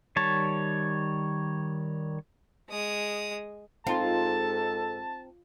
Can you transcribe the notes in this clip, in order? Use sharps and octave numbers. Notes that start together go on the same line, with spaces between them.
D#3 G3 C#5 A5
G#3 D#6
G#2 C4 D#4 F4 A4 A5